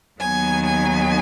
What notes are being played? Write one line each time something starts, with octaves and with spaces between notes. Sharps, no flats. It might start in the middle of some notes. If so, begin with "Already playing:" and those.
D#2 D#3 F#3 B3 G#5
G#5